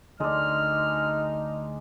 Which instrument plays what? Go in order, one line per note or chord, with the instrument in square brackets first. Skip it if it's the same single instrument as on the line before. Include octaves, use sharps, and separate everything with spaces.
[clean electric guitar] D2 [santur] G#3 D4 [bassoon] D#4 [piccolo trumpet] F6